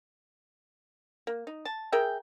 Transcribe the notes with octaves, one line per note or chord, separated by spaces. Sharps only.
A#3
D#4
A5
G#4 A#4 E5 G5